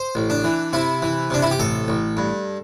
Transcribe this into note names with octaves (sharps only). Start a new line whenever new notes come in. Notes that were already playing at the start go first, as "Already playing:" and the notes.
Already playing: C5
A1
D4
E3
C3 E4
E3
C3 D4
E4
G4
A1 A4
A1
G2